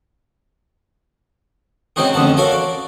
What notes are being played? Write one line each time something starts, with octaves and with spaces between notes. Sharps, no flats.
C#3 G#3 C4 D#4 F#4 G#4
A1 F2 D3 F#5 A5
F#4 A4 A#4 C#5 F5
D5